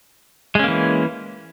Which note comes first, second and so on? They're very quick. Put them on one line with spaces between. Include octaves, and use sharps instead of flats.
G#3 C#4 A#3 E3